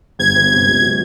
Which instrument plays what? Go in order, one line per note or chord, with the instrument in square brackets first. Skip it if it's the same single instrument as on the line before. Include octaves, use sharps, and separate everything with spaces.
[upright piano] G1 [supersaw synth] G#6
[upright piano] G1
C3
C#2
F#3